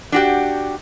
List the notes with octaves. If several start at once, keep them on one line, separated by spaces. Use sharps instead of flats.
D4 F#4 G4